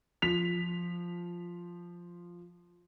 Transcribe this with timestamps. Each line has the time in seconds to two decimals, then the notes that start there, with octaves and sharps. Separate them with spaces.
0.22 F3 B6 F7